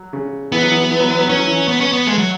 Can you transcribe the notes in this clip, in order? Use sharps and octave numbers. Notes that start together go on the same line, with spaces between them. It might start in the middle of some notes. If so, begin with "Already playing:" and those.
Already playing: F#3
C#3
E3 B3
F#3
E3
F#3
E3
F#3
E3
F#3
E3 C#4
F#3
E3
B3
C#4
B3
G#3 A3
F#3